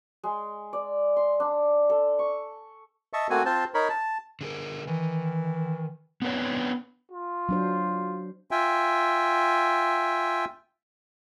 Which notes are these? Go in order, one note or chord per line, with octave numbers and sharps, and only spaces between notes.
G#3
D5
C6
D4
A4
C#6
D#5 E5 A5 C#6
A3 A#3 C4 F#4 G#5
C4 F4 C5 A5
D#4 A#4 C#5 B5
A5
D3 G#4 A#4
D#3 E3
B3 C4 D4 B4 C#5 G5
F4
F#3 D4 C5
F4 E5 G5 G#5